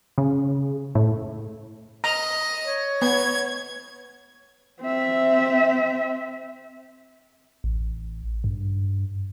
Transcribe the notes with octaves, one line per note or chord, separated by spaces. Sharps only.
C#3
A2
D#5 A#5
C#5
B3 G#6
C4 E5
A1
G2